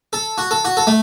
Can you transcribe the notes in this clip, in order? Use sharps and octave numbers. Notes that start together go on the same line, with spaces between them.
A4
F#4
A4
F#4
A4
A3